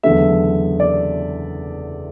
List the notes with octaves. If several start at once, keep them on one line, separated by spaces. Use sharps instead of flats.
F#1 E2 D3 A3 E5
D5